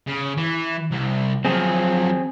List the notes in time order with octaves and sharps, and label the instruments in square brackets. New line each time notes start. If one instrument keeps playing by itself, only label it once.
[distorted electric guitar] C#3
E3
C2
[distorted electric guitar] F3 F#3 [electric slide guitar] C4 G#4